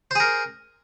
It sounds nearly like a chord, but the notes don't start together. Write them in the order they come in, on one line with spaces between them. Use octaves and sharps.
C5 G#4 A#4